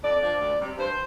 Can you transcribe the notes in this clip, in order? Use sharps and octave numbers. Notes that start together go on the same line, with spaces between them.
F2 D5
F3 D4
D2
C3 G3
G2 C5